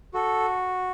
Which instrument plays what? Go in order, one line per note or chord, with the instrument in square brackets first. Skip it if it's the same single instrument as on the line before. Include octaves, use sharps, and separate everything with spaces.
[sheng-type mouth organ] F#4 A4